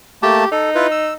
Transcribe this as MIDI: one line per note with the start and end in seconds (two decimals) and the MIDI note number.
0.23 0.45 57
0.23 0.45 58
0.23 0.48 67
0.23 0.45 81
0.52 1.14 63
0.52 0.70 69
0.75 0.87 64
0.75 0.87 65
0.75 0.87 71
0.91 1.14 88